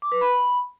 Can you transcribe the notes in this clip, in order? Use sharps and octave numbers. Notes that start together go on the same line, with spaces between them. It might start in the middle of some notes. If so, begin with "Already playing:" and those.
D6
B4
B5